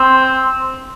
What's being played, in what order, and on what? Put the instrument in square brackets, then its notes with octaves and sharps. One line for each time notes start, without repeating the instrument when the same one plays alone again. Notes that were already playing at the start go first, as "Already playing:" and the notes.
Already playing: [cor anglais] C4